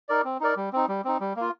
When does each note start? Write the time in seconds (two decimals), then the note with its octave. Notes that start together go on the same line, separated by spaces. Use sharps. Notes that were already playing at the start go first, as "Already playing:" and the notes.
0.09 D#4 A#4 D5
0.25 C4
0.41 D#4 A#4 D5
0.57 G3
0.73 C4 D#4
0.89 G3
1.05 C4 D#4
1.20 G3
1.36 A#3 F4